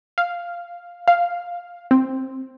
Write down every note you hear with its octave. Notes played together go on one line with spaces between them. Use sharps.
F5
F5
C4